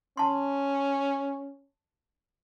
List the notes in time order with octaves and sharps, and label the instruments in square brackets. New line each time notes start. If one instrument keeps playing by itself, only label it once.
[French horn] C#4 [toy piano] A5 C6